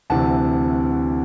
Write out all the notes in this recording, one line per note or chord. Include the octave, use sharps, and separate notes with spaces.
D2 C3 E3 F#5 A5